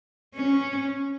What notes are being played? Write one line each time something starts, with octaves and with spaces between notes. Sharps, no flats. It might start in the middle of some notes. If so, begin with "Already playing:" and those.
C#4